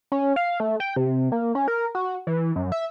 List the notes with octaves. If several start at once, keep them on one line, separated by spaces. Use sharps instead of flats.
C#4
F5
A3
G5
C3
A#3
C#4
A#4
F#4
E3
F#2
E5